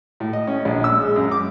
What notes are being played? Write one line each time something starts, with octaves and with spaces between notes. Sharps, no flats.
A2
D#5
C#4
A#1
E6
G#3
F#2
D6